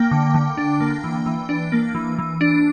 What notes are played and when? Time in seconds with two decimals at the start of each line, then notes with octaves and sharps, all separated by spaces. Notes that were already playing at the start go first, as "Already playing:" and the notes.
Already playing: A#3 G5
0.11 D3
0.34 D3
0.57 D4
0.80 A#3
1.04 E3
1.26 E3
1.49 D4
1.72 A#3
1.95 E3
2.18 E3
2.41 D4